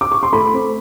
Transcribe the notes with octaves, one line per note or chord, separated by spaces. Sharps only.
D6
C#6
C6
A3 B5
C4